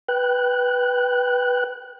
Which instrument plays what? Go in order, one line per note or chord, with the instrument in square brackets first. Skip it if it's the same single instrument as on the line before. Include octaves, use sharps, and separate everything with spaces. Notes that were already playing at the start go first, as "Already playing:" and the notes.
[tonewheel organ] B4 G5 F#6